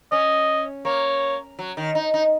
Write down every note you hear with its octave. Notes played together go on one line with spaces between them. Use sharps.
C#4 D#5
A#3 C#5
F#3
D#3
D#4
D#4